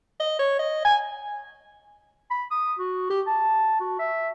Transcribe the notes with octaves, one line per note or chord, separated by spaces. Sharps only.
D#5
C#5
D#5
G#5
B5
D#6
F#4
G4
A5
F#4
E5